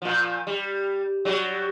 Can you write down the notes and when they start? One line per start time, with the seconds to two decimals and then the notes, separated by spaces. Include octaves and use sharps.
0.02 A#2 F3
0.47 G3
1.25 F#3 G3